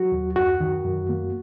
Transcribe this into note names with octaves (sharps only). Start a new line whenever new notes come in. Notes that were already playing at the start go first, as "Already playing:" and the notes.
Already playing: F#3 F#4
D#2
F#2 F#4
D#3
F#2
A#3